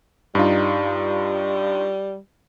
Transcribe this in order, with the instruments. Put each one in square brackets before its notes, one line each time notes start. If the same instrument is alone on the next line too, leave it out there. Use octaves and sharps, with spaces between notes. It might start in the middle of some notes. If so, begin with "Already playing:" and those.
[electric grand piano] G2 D#4 F4 [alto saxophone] G3